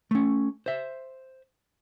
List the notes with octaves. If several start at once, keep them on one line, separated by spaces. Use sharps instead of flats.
A3 C#4
C5 E5